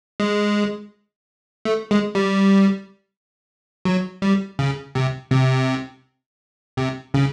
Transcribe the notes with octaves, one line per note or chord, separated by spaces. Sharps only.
G#3
A3
G#3
G3
F#3
G3
C#3
C3
C3
C3
C#3